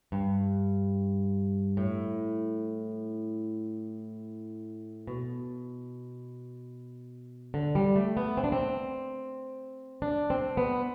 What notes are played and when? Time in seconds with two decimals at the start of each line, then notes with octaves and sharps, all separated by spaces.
0.12 G2
1.77 A2
5.07 B2
7.54 D3
7.75 G3
7.96 A3
8.17 B3
8.37 C4
8.44 D4
8.52 C4
10.02 D4
10.30 C4
10.57 B3